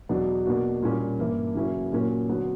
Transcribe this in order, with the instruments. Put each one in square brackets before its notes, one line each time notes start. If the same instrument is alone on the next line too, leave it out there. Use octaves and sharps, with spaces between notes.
[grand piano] E2 B2 F#3 B3 D4
B2 A#3 D4 F#4
A#2 G3 A#3 C#4
G2 E3 A#3
C#3 F#3 A#3 C#4 E4
A#2 F#3 A#3 C#4
D3 F#3 B3 F#4